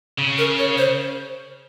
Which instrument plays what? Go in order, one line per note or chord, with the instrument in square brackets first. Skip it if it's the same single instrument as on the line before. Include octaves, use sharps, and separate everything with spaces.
[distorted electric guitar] C#3
[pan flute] A#4
C#5
C5